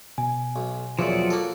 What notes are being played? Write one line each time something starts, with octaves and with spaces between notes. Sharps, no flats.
B2 G#5
B1
E2 A#2 F3 F#3 D5
A#3 A4